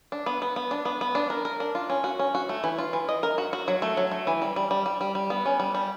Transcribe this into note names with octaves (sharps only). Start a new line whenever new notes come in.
D4
B3
B3
B3
D4
B3
B3
D4
A#4
A#4
D4
F4
C#4
F#4
C#4
F#4
A3
E3
F4
E3
D#5
A#4
F#4
F#4
F#3
A3
F#3
A3
E3
G3
G3
G3
G3
G3
G3
B3
C#4
G3
G3